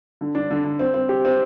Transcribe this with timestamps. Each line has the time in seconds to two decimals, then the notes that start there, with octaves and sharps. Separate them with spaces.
0.21 D3
0.35 D4
0.51 D3
0.64 D3
0.79 C4
0.94 C4
1.09 G4
1.25 C4